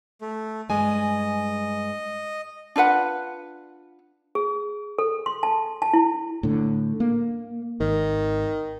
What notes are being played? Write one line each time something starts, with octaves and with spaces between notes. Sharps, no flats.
A3
G2 G#3 D#5 G#5
D4 F4 B4 F#5
G#4
A4
C6
A5
A5
E4
A2 D3
A#3
G#1 D#3